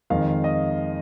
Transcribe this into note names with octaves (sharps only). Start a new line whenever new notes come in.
F2 D#3 G#3 F5
D#5